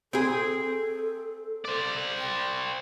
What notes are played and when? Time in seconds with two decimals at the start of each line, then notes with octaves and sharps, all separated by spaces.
0.13 C4 G#4 A4
1.65 C5 D5
2.18 G5